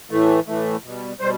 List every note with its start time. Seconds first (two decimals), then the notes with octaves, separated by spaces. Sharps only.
0.11 A2 E3 A3
0.48 A2 E3 A3
0.84 B2 G3
1.20 B2 G3 C5